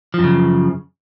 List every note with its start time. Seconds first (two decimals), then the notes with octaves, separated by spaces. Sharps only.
0.14 F3
0.19 F#2
0.24 C#3